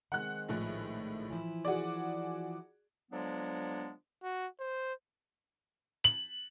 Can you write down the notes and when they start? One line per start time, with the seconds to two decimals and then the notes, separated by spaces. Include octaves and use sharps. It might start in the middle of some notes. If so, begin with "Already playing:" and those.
0.12 D#3 G#3 C4 F#5 F#6
0.49 A#1 A2
1.30 E3 F3 E4
1.65 F#4 G#4 D5
3.11 D3 F3 F#3 G#3 B3 D4
4.23 F#4
4.60 C5
6.04 F#7